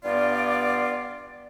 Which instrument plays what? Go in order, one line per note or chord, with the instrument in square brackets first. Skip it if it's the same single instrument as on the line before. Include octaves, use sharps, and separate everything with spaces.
[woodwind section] G2 B3 F4 D5